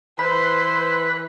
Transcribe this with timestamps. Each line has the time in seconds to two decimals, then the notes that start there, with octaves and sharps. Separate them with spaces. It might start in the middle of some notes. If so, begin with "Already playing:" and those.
0.19 E3 B4 C5 B5